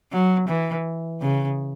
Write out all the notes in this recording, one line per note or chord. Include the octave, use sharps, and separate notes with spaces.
F#3
E3
C#3